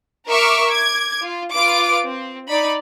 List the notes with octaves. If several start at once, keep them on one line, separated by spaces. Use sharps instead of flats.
A#4 E5 C#6 D6 F6
D6 G#6
F4
F4 B4 D6 D7
C4
D#4 D5 B5